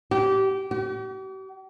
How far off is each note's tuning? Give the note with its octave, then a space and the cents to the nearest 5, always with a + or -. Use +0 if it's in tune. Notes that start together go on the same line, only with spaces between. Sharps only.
G4 -25
G4 -45